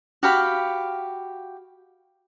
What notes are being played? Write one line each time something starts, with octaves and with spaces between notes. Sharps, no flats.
F#4 G4 F5 B5